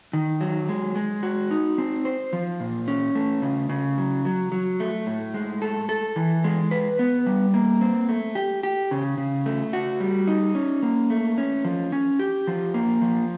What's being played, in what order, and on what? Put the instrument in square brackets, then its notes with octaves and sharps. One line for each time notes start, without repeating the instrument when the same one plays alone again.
[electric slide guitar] D#3
F#3
G#3
G#3
F#4
D#4
C4
C5
F3
A#2
C#4
A3
C#3
C#3
F#3
F#3
F#3
A3
A2
G#3
A4
A4
E3
G#3
B4
B3
G3
A#3
C4
A3
G4
G4
C#3
C#3
A3
F#4
G3
D#4
C#4
A#3
A3
C#4
F3
C#4
G4
F3
A#3
F3